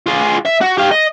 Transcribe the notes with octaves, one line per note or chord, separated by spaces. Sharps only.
F4 G#4
E5
F#4
G4 F5
D#5